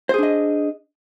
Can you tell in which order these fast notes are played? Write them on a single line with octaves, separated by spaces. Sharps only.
C5 G#4 D4 D#5